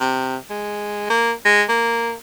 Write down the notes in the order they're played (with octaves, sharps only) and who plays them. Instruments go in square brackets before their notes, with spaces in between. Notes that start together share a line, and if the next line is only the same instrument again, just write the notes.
[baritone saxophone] C3
G#3
A#3
G#3
A#3